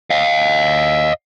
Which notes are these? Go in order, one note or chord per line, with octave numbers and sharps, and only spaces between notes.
D#5 F5